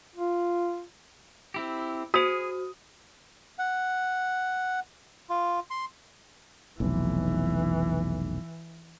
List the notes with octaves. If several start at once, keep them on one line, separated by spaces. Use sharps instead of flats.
F4
C4 E4 G4
F#4 G#4 C5 D#6
F#5
F4
C6
F1 B1 E3